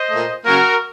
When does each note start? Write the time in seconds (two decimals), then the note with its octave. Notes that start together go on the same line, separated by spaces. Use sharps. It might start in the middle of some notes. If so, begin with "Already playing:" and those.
Already playing: C5 D#5
0.10 A#2 A3
0.45 C#3 F#3 A#3 F#4 A#4